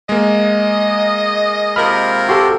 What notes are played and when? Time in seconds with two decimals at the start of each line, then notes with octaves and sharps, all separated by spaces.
0.09 G#3 A#3 D#5
1.76 C3 F4 A#4 B5 F6
2.29 F#4 G4 A4 C6